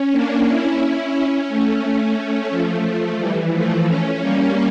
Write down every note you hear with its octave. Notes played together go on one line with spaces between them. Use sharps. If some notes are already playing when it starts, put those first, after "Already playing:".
Already playing: C#4
A#3 D4
C#4 E4
C#4 E4
C#4 E4
A3 C#4
A3 C#4
F3 A3
E3 G3
F3 A3
A3 C#4
G3 A#3